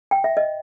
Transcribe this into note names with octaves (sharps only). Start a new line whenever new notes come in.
G5
E5
D#5